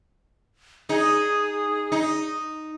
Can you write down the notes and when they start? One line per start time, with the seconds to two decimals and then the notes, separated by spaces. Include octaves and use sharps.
0.89 D#4 G#4
1.92 D#4